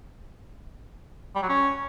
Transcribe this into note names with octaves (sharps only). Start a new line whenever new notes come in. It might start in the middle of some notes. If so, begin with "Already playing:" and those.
G3
F#3
C#4